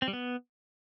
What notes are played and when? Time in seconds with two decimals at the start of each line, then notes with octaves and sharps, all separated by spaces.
0.02 C4
0.08 G3
0.13 B3